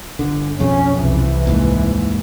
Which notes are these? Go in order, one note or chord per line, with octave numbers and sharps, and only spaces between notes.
G1 D3
B1 F2 C#3 C#4
C2 E3
D#2 G#2